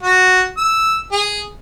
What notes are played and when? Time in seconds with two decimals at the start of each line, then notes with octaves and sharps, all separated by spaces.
0.03 F#4
0.57 E6
1.12 G#4